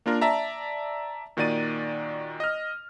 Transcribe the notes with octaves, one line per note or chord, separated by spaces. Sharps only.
A#3 D4 F4 A#4
D5 E5 A5 A#5
A#2 D#3 F#4 D5 A6 D#7
D#5 F6